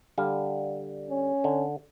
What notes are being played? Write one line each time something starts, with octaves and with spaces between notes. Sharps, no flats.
D3 G3 F5
C#4
D3